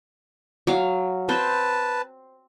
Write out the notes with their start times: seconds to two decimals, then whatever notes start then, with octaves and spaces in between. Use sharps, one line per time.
0.67 F#3 F5
1.29 C4 B4 C5 A5